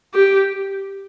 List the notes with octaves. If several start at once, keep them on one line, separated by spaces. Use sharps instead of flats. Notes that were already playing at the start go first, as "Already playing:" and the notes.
G4